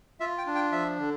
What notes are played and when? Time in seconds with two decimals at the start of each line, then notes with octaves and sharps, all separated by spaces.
0.20 F4 E5
0.38 G5
0.47 D4
0.55 G5
0.72 F3 E5
0.99 D3